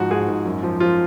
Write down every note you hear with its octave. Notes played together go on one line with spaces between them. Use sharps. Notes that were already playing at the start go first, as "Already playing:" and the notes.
Already playing: G#2 F3 F#4
G#2 G#4
G#2
F#2
F3
F3 F4